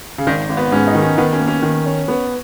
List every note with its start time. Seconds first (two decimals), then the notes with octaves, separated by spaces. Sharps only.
0.18 C#3
0.27 G#1 D#3
0.49 G#1
0.57 B3
0.72 G#2 C#4
0.87 D#4
0.95 D#3
1.02 C#4
1.18 D#3 B3
1.33 C#4
1.40 A#3
1.48 C#4
1.62 D#3
1.86 C#4
2.08 B3